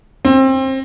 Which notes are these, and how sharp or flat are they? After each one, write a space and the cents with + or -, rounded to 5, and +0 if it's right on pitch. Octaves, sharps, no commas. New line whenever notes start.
C4 +25